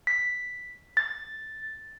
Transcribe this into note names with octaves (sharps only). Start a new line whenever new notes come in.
B6
A6